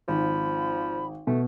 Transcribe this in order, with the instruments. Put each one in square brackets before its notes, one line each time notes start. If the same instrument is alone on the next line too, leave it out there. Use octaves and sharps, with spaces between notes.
[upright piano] G#1 [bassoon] F3 [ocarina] B5
[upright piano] B2 [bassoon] A3